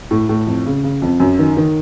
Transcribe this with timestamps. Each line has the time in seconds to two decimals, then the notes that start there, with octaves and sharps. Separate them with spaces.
0.11 A2
0.29 A2
0.47 F2
0.66 C#3
0.84 C#3
1.02 F2
1.20 F#2
1.39 D#3
1.57 D#3